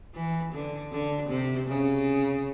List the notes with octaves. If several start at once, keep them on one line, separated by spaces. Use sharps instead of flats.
E3
D3
D3
C3
C#3